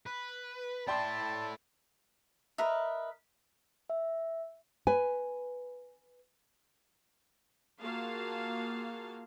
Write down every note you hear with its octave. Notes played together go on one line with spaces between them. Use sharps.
B4
E4 A4 D5 G5 A5 C6
A#4 B4 D#5 E5
E5
B4 G#5
A#3 F4 F#4 G#4 F5 A5